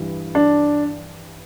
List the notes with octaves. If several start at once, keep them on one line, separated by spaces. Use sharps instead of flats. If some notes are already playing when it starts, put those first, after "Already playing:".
Already playing: G2 E3
D4